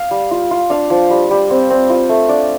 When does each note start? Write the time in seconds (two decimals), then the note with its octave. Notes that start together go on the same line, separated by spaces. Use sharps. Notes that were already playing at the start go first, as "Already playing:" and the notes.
Already playing: F5
0.11 G3
0.31 F4
0.51 F4
0.70 D4 F5
0.90 F3
1.10 G3
1.31 G3
1.50 C4
1.70 C4
1.90 F4
2.09 A3
2.29 D4 D5